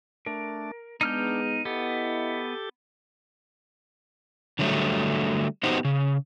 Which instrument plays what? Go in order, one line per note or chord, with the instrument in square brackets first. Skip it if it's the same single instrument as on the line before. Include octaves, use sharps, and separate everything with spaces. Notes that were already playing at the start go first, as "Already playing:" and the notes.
[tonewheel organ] A3 D4 [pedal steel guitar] A#4
[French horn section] G#3 B3 [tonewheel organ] D4 [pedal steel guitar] D#4 F6 G6
[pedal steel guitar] B3 [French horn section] E4 D#5 [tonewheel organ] G4 A4
[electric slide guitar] D3 F#3 G3 A3
B3 D#4 F#4 G4 C5
C#3